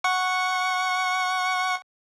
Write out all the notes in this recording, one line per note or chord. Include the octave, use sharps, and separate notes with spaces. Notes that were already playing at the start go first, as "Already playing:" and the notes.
F#5 C#6